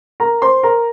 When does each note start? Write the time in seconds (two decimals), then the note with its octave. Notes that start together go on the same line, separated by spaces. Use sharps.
0.20 A#4 A#5
0.42 C5 C6
0.63 A#4 A#5